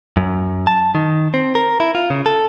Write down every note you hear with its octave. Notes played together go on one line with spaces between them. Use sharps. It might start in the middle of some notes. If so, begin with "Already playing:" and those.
F#2
A5
D#3
C4
A#4
E4
F4
C#3
A4